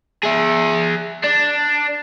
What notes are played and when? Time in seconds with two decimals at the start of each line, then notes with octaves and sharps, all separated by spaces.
0.24 G#4 E5
1.24 D4